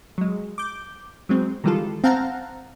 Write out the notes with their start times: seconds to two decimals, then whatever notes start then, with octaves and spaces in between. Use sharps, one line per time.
0.18 F#3 G#3
0.58 D6 G6
1.29 F#3 G#3 C4
1.64 D#3 E3 G3 G#3 F4 A4
2.04 C4 F5 F#5 A5 A#5